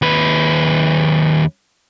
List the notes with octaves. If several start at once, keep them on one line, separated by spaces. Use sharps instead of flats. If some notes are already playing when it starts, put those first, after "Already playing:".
D#2 B4